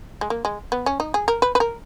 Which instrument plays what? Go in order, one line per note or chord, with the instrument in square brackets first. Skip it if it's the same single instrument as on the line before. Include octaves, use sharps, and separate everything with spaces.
[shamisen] G#3
A#3
G#3
B3
C#4
D#4
G#4
A#4
B4
B4
A#4